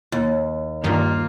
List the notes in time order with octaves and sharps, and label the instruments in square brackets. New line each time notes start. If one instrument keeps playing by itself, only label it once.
[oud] D#2
[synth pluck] G2 D#3 [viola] A#3 F4